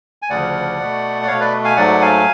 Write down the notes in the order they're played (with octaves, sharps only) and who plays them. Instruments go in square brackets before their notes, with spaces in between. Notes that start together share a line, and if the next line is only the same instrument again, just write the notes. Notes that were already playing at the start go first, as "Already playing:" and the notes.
[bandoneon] G#5
D2 C#3 F3 D5 F#5
B2 A3
D5
B2 A3 C#5 F5
B4 D5
F5 G#5
G#2 F#3 A3 D5 F#5
F5 G#5